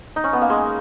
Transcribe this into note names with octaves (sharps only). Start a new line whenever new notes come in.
D#4
C#4
B3
A#3
G#3